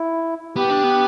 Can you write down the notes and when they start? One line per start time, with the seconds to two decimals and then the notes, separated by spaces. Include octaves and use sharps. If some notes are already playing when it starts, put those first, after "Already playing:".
Already playing: E4
0.56 B3 G4
0.70 D4
0.84 B3